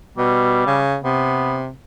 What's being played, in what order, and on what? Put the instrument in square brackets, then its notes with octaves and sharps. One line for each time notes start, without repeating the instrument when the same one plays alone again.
[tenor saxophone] B2 [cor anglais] G3
[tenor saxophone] C#3
[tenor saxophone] C3 [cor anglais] B3